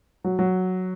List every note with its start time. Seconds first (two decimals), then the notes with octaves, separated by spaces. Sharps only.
0.24 F#3
0.39 F#3